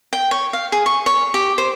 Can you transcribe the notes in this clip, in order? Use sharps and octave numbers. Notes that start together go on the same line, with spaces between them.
G5
C#5
F5
G#4
C#6
C#5
G4
C5